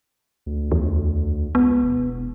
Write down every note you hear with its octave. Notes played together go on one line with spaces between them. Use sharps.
D2
E2
C#2 B3
E1